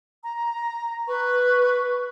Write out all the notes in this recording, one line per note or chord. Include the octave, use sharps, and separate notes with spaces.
A#5
B4 C#6